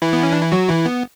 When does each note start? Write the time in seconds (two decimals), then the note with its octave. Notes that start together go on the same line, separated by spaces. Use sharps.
0.02 E3 E4
0.13 B3
0.23 C#4
0.33 D4
0.42 E4
0.52 F#3 F#4
0.69 E3 E4
0.86 B3